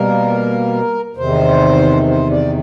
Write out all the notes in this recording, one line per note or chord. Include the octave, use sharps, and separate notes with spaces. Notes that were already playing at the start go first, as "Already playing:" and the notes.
Already playing: B2 G3 A#3 A#4
E2 C3 D#3 C5
C5
D5